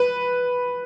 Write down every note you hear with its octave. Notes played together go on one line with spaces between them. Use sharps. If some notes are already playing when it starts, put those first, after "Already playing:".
Already playing: B4